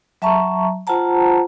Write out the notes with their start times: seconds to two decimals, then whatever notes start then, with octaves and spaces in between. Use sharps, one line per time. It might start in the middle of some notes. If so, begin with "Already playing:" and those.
0.22 F#3 E5 A5 A#5 C#6
0.87 F4 C5 F#5 A5 A#5